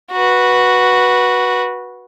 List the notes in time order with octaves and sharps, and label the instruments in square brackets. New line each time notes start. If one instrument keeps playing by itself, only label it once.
[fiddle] F#4 B4